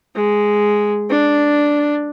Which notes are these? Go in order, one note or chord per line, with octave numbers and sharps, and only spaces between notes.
G#3
D4